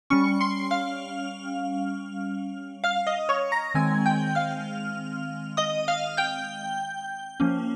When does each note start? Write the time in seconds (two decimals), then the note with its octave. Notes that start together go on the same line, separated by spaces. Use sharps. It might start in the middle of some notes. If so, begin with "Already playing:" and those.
0.10 G3 C#4 C#6 C#7
0.41 C6 C7
0.71 F5 F6
2.84 F5 F6
3.07 D#5 D#6
3.29 C#5 C#6
3.52 A#5 A#6
3.75 D#3 G#3 C4 G#5 G#6
4.06 G5 G6
4.35 F5 F6
5.57 D#5 D#6
5.88 F5 F6
6.17 G5 G6
7.40 F3 A#3 C#4